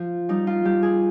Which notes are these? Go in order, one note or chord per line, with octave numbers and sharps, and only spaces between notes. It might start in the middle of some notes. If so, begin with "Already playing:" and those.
Already playing: F3 F4
G3 D#4
F4
G3 G4
G#4